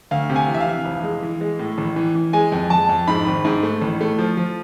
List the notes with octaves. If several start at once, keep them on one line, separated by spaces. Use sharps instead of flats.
D2 F5
C3
G#5
E3
E5
F5
E3
F1
G#3
E3
G#3
A2
A1
E3
E3
G#3 G#5
F2
F2 A5
F2
G#2 B5
G#1
G#2
A3
A1
A3
F3
F3